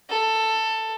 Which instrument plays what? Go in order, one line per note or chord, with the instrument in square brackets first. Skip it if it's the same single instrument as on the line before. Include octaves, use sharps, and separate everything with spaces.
[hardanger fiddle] A4